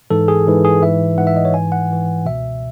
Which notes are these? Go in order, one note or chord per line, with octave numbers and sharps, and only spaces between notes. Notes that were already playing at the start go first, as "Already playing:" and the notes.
G#2 E3 A4
G#4
G#2 E3
G#4
G#2 E3 E5
G#2 E3 F#5
E5
D#5
C#5
G#2 E3 G#5
F#5
G#2 E3
C#2 B2 E5